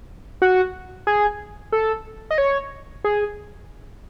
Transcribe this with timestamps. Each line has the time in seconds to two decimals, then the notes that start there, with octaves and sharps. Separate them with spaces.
0.42 F#4
1.07 G#4
1.72 A4
2.31 D#5
2.38 C#5
3.04 G#4